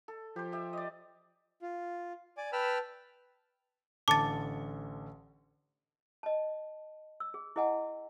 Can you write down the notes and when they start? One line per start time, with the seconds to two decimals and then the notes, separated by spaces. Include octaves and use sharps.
0.08 A4
0.36 F3 G4 C5
0.52 G4 E5
0.73 D5 D#5
1.62 F4
2.37 D5 G#5 D6
2.52 B4 G5 A5 B5 E6 F6
4.08 A1 D3 A5 D6 A6 C#7
6.23 D#5 A5
7.20 E6
7.34 G#4
7.56 E4 G#4 D#5 F#5 G#5